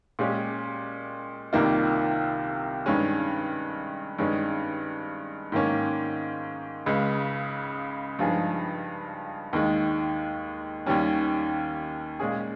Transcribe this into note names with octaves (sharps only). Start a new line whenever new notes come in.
A#2 G#3 C#4 G4
C2 C3 D#3 A#3 F4
G2 D#3 G#3 C#4
G2 D#3 G#3 C#4
G#2 D#3 A#3 C#4
C#2 C#3 G#3
G2 F3 G#3 D#4 G#4
D#2 D#3 G#3
D#2 D#3 G3 C#4
A#2 G#3 C#4 G#4